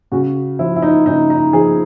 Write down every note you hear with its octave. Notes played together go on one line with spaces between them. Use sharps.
C#3 F#4
F3 E4
E4
D#4
C#3 D#4
D#4
F3 G#4